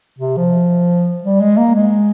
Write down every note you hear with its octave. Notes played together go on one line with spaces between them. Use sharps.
C3
F3
G3
G#3
A#3
G#3